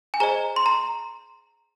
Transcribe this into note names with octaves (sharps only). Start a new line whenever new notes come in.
G#5
G#4 C5 D#5 A#5
C6
A#5